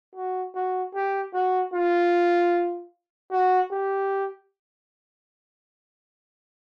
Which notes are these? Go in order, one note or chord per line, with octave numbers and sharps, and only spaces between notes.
F#4
F#4
G4
F#4
F4
F#4
G4